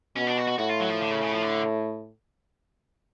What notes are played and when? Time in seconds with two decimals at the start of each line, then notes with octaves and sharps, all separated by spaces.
0.16 B2 C#4
0.27 D4
0.37 F#4
0.48 F#4
0.59 A2 F#4
0.69 F4
0.80 F#3
0.90 F3
1.01 D3
1.11 C#3
1.21 C#3
1.32 F3
1.42 D3